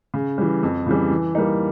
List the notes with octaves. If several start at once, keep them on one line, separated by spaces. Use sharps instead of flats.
C#3
E3 G3
F2
C#3 E3 G3
E3
G3 A#3 D#4